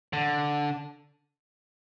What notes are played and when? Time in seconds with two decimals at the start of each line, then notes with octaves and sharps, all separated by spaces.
0.13 D3